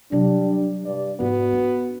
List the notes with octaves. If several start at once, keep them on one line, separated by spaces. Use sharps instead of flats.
C3 F#3 G3 D4
G2 D5
G#2 B3 F#4
D4